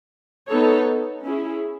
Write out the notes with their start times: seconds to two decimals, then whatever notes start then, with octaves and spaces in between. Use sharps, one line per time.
0.50 B3 D#4 A4 C#5
1.25 C#4 E4 G#4